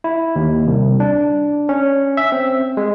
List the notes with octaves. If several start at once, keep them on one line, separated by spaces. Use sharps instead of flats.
E4
D#2
C2
D4
C#4
E5
C4
G#3